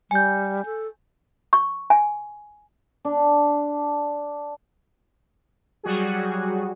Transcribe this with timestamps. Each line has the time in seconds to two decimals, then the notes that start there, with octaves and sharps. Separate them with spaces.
0.11 G3 G#5 G6
0.66 A4
1.53 C#6
1.90 G#5
3.05 D4
5.83 F#3 G3 F#4 G#4